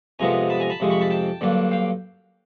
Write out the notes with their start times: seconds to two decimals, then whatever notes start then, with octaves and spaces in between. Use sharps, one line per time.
0.19 F2 C3 F3 G#3 B3 G#5 A#5
0.50 A5 B5
0.60 G#5 A#5
0.70 A5 B5
0.80 F2 C3 F3 G#3
0.90 B5 C#6
1.00 A5 B5
1.10 G5 A5
1.41 G2 D3 F#3 A#3 D4
1.71 F5 G5